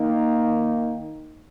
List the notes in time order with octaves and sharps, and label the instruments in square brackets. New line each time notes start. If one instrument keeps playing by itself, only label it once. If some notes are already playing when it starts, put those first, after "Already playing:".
Already playing: [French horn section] D#3 A#3 D#4